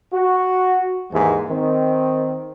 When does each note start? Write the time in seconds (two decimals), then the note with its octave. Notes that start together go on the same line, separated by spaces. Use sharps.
0.13 F#4
1.13 D#2 G#2 E3 G#3
1.50 D#3 C4